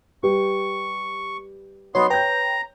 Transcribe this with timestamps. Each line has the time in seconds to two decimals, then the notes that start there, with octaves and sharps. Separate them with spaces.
0.23 G3 G4 B4 C#6
1.95 F#3 B3 D#4 C#5 C6
2.10 B4 C#5 G5 A#5 G6